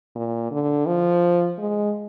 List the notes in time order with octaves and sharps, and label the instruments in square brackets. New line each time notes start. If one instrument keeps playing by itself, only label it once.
[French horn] A#2
D3
F3
G#3